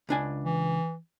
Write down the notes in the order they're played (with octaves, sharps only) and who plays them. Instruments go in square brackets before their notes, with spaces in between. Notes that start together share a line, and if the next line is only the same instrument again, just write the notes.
[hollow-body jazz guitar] C#2 D4 G#5
[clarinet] E3